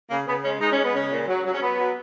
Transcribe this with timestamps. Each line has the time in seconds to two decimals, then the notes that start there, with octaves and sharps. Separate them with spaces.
0.10 C#3 A#3
0.27 C#3 B3
0.43 G#3 C#4
0.60 G#3 D#4
0.72 C#4
0.78 G#3
0.83 B3
0.95 C#3 C#4
1.11 A#2
1.27 F#3
1.45 F#3
1.54 C#4
1.61 F#3 B3
1.78 F#3